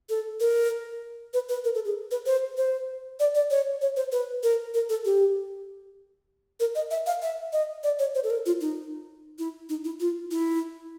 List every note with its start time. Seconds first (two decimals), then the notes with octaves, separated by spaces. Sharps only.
0.10 A4
0.40 A#4
1.34 B4
1.49 B4
1.64 A#4
1.75 A4
1.85 G#4
2.11 B4
2.26 C5
2.57 C5
3.20 D5
3.35 D5
3.50 C#5
3.81 C#5
3.96 C5
4.12 B4
4.43 A#4
4.74 A#4
4.89 A4
5.05 G4
6.60 A#4
6.75 D#5
6.91 E5
7.06 F5
7.22 E5
7.53 D#5
7.84 D5
7.99 C#5
8.15 C5
8.24 A4
8.30 A#4
8.46 F4
8.61 D#4
9.39 E4
9.69 D#4
9.85 E4
10.00 F4
10.31 E4